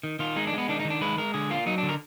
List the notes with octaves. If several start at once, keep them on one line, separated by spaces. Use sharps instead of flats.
D#3
D#3 F4
G#3 D#4
D4
G#3 B3
D#3 D4
D#4
D#3
D4
G#3 B4
G#3 A#4
D3 G#4
A#3 F4
F#3 D#4
D4
D3
A#4